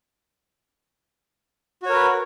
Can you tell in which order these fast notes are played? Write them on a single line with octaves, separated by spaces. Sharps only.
F#4 C#5 A#4 B4